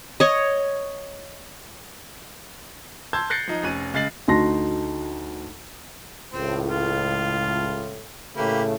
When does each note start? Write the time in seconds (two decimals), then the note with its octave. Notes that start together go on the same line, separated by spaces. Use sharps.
0.20 C#5 D#5
3.13 A5 C6 E6 G6 G#6
3.30 F#6 G6 A6 A#6 C7 C#7
3.48 F3 D#4
3.63 F1 C#4 F#6 D#7
3.94 C#3 G#3 A6 C7 F#7
4.28 D2 D#4 F#4 A5 C6 A#6
6.33 C#2 A2 C4
6.69 F4
8.36 A2 C#3 A3 A#3 G4 B4